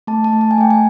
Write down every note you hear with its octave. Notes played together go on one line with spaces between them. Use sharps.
A3 A5
A5
A3
A5
G#5
A3 G5
G#5